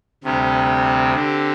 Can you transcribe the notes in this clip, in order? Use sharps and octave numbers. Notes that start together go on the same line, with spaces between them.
D2 C3 G3 C4 G4
D3 C4 G4